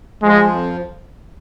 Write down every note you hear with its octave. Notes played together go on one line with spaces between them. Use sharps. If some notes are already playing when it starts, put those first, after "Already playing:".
F3 G#3
F2